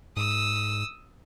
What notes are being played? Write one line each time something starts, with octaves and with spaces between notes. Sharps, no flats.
G#2 D#6 E6